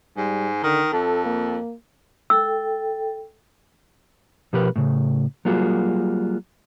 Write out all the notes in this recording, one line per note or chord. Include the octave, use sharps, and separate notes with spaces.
G#2 G3
D3 D#3
F2 A4
A#3
A4 G5 E6
B2 F3 G4 A#4 B4
A2 C#3
F#3 G3 A#3 F4 F#4 G#4